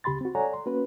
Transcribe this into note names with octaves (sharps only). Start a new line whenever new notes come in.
D2 C#3 G4 B5 C6 A6
C4 F#4
A4 C#5 D5 F#5 G#5 A#5
C6
A#3 C#4 F#4 B4